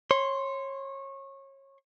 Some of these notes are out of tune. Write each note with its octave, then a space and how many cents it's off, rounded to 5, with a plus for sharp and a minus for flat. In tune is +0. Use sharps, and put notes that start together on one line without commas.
C#5 -25 C6 -5